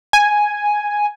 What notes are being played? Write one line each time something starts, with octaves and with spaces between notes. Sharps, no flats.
G#5